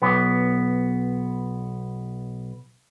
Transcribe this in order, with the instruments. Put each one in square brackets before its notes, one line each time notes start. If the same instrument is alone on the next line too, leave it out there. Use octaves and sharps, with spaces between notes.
[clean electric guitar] B1 B3